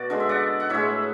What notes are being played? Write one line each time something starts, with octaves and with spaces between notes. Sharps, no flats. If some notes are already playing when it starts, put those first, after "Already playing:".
Already playing: B2 F#4 D5
D3 G#3 F#5
E5
D5 F#5
F#5
A2 G#3 C#5 E5